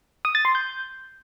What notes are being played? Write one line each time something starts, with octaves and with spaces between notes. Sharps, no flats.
D#6
A6
C6
G6